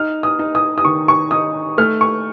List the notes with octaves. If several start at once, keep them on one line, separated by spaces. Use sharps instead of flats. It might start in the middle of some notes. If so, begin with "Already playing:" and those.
Already playing: D#4 F6
D#6
D#4
D#6
D#6
D#3 C#6
C#6
D#4 D#6
A3 F6
C#6